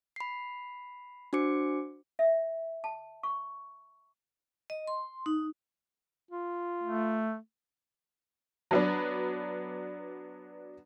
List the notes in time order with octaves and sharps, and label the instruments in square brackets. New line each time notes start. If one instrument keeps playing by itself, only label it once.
[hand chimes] B5 C7
D4 F#4 C5 D6 C#7
[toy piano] E5
A5
C#6
[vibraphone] D#5
C6
D#4
[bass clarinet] F4
[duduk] A3
[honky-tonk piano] F#3 B3 D4